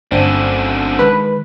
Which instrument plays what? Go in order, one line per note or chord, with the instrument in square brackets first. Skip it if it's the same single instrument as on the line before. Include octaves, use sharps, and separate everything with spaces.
[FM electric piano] G1 C4 D4 [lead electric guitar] F#2 D3 [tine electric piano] A3
[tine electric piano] D#3 G#3 [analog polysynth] B4